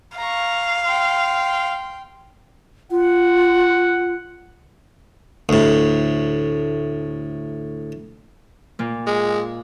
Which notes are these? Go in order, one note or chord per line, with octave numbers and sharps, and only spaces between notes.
F5 A#5 C#6
G5 C6
F4 F#5
D2 A2
A#2 A#3
G#3